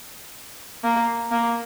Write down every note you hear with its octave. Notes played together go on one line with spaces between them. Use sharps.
A#3
A#3